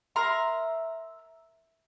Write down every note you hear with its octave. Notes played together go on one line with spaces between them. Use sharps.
A#4 E5 A#5 C6